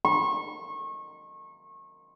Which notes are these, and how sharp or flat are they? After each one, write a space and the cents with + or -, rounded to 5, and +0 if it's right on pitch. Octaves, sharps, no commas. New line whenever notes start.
C#6 -30